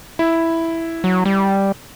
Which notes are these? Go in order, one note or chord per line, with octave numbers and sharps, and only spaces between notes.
E4
F#3
G3